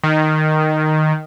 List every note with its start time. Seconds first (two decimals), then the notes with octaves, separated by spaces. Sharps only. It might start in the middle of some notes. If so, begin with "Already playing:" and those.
0.04 D#3